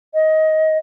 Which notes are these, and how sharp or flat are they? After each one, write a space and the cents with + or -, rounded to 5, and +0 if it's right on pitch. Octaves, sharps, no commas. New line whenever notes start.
D#5 +20